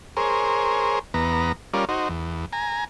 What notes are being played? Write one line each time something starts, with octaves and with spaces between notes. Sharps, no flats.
G#4 A#4 C5 C#5
E2 B3 A#5
G3 C#4 F4 A#4 D5
D#4 F#4 C5
E2
G#5 A#5